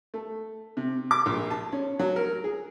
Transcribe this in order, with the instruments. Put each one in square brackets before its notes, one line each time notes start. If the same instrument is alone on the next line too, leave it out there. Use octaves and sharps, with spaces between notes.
[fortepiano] A3
C3
D6
A#1
A5
C#4
F#3
A#4
G#4